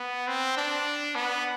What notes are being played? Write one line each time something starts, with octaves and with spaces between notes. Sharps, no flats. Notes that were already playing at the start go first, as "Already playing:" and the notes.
Already playing: B3
C4
D4
B3